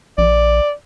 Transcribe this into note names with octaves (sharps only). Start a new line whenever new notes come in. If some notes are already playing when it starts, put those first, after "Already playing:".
A#1 D5